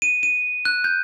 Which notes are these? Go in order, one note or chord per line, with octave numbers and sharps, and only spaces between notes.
D#7
D#7
F#6
G6